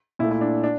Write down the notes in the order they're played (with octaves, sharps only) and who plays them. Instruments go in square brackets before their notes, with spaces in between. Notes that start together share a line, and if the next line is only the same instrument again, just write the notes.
[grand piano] A#2 E4
A3
E4
D4
D4